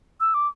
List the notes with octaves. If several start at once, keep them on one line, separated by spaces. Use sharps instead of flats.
E6
D6